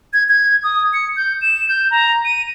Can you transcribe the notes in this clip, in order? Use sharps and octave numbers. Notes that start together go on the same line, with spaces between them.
G#6
G#6
D#6
C#7
G6
E7
G6
A#5
D#7